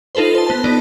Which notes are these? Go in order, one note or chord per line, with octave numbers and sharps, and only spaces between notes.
D#4 F4 A4 B4 C5
C5 A5
B3 C5 A5
B3 D#4 D5